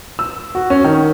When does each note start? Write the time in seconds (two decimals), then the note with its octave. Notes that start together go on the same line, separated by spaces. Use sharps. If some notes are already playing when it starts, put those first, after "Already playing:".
0.19 E6
0.55 F#4
0.70 C#4
0.84 D#3